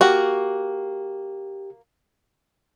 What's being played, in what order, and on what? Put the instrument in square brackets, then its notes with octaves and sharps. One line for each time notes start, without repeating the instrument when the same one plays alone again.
[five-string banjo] A#3 F#4 [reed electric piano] G4